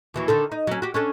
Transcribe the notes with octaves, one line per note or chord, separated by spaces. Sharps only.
D#2 E3 F#3
D3 D#3 A4
D#4
F#3 C#4
F#4 G4
C#4 D4 A4